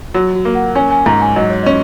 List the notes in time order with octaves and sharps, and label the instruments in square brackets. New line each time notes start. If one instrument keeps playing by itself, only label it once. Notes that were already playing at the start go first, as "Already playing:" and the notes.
[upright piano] F#3 [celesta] F#4
[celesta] F#4
[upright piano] A#3
[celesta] F#5
[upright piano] C#4 [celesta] G#5
[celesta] G#5
[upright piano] G#2 [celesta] A#5
[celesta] G#5
[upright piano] F#3 [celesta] D#5
[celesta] C#5
[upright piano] C#4 [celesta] D#5